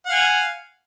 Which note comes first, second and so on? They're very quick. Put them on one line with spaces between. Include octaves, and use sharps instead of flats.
F#5 F5 G#5